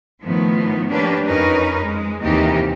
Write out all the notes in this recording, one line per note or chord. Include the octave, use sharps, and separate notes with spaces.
A2 D#3 F3 B3
A#3 C#4 D4 G4 B4
F2 C#4 D#4 A#4 B4
G#3
D#2 C3 E3 A#3 D#4 G4